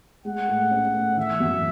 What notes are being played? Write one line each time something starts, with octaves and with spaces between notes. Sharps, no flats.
G#3 F#5
A2
C#4
A2
E3 E5
F#2